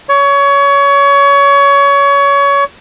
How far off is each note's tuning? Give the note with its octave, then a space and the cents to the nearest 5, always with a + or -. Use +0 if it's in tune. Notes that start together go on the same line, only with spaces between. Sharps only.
C#5 +25